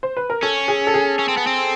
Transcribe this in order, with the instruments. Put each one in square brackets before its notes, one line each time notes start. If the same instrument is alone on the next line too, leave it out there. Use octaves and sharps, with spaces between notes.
[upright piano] C5
B4
A#4
[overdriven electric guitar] C#4 [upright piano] A4
[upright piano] G#4
A4
G#4
[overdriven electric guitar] C#4
C4
B3
C4